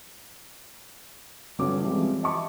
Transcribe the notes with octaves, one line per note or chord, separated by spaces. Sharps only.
G1 F#3 G3 C#4 A4 D6
E3 F3 G3 G#3 C4
D#5 E5 A5 B5 C#6 D6